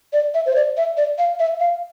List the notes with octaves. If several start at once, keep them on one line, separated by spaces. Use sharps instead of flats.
D5
E5
C5
D5
E5
D5
F5
E5
F5